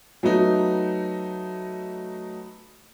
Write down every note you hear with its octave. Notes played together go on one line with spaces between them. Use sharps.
F#3 A3 B3 D#4